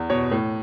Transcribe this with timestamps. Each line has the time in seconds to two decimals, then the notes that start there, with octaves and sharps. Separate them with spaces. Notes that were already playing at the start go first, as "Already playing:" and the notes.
Already playing: E2
0.10 B2 C#5
0.31 A2